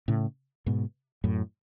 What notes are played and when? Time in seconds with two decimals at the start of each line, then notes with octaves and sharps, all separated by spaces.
0.08 A2 C#3
0.66 G#2 B2
1.24 F#2 A2